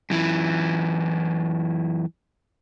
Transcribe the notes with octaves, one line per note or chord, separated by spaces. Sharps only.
F#2 E3